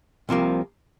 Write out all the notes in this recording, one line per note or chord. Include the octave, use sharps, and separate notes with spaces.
C2 C3 F3 A#3